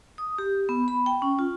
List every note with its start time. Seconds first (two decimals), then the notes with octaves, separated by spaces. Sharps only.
0.18 D#6
0.38 G4
0.69 B3
0.88 B5
1.06 G5
1.22 C#4
1.39 F4